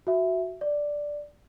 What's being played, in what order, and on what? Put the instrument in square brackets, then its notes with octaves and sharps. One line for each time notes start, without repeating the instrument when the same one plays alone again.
[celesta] F#4 E5
D5